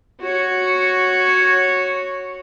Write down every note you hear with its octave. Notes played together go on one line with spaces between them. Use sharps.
F#4 C#5